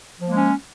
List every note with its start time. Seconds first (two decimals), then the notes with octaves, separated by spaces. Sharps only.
0.20 F3
0.25 A#3
0.30 G#3
0.34 C#4